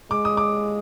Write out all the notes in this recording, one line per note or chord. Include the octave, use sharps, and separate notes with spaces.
G#3 D6
D#6
D6